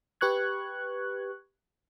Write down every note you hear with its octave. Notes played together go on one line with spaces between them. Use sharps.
G4 B4 C#6 F#6 G#6